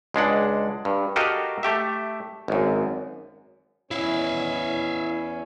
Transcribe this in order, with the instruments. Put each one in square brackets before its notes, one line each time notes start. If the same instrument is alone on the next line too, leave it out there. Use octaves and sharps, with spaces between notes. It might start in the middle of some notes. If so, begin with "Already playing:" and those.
[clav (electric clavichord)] C#2 G#3 D4 F#5
G2
F#4 G4 A4 A#4 D#5 F5
A3 G4 E5
G#1 F#2
[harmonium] E2 C#4 C#5 [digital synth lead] E4 [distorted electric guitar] E5 F5